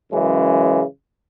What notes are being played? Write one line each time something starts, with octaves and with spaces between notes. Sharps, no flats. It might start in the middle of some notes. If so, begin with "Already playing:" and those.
F#2 C#3 E3 G#3